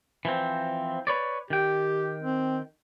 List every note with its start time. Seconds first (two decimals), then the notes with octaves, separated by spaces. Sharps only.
0.25 E3 F3 C4
1.07 B4 C#5 D5
1.50 D#3 G4 G5
2.22 C4